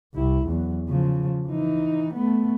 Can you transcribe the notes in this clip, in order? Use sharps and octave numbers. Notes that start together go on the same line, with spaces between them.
C2 E4
E2 F#3
C#3 F3
E3 D#4
A3 B3